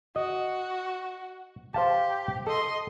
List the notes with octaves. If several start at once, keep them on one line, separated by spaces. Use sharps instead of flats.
F#4 D#5
G4 C5 F5 A5
A4 D#5 C6